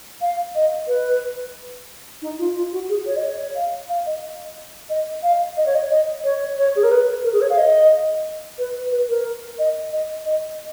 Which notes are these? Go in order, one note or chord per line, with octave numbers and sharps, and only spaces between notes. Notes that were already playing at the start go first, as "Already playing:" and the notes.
F5
D#5
B4
D#4
F4
F4
F#4
G#4
C#5
D#5
C#5
F5
F5
D#5
D#5
F5
D#5
C#5
D#5
D#5
C#5
C#5
G#4
A#4
B4
A#4
G#4
C#5
F5
D#5
B4
B4
A#4
D#5
D#5
D#5